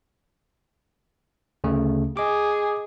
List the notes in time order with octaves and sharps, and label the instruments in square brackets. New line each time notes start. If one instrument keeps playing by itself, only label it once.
[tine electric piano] D2 C#3 A3
[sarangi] G#4 [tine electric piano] D#5 D6